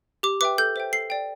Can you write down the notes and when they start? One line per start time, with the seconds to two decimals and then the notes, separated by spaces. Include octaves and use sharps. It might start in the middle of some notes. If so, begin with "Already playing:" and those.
0.23 G4 D6
0.41 B4 E5 G5 D6
0.58 A4 G6
0.76 C5 E5 G5
0.93 A4 C7
1.10 D5 G5